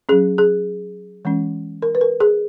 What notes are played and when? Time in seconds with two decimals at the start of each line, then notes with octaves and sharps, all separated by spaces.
0.09 F#3 C#4 G#4
0.38 G#4
1.25 E3 G#3 C#4
1.82 A#4
1.95 B4
2.01 A#4
2.20 G#4